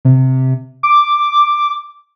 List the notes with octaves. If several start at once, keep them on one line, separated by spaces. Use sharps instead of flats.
C3
D6